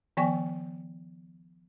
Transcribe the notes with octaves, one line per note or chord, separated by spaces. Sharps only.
D#3 F3 B3 D5 G5 G#5